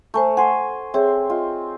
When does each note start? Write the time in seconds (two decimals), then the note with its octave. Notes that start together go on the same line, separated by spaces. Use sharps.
0.14 A3 C5 G#5 A#5
0.37 F#5 G#5 C6
0.94 C4 G#4 C#5 E5
1.30 F4 D#5